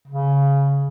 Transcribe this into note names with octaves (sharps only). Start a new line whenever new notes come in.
C#3